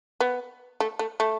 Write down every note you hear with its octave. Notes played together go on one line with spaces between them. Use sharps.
B3
A3
A3
A3